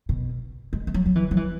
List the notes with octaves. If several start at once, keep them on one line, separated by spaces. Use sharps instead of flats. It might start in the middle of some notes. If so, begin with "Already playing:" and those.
B2
G#3
G#3
F#3
F#3
E3
F#3
E3